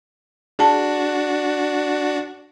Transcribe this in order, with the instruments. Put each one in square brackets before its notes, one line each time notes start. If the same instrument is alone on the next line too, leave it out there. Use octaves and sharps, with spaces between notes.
[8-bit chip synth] D4 F#4 [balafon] G#4 A5